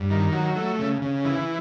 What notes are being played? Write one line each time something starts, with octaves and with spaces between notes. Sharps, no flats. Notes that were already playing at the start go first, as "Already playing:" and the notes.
Already playing: G2
D#3
F#3
A3
C#3
C#3
E3